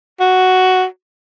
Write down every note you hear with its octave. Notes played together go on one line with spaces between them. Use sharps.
F#4